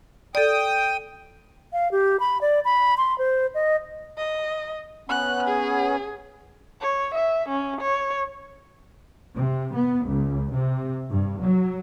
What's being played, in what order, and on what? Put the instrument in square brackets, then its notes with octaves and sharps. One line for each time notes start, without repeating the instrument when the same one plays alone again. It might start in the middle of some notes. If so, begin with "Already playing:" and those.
[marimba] A4 D5 [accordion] G5 D#6
[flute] F5
G4
B5
D5
B5
C6
C5
D#5
[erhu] D#5
[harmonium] B3 C#4 [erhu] F#6
[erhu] G#4
[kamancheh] C#5
E5
C#4
C#5
[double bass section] C3
B3
C#2
C3
G2
F#3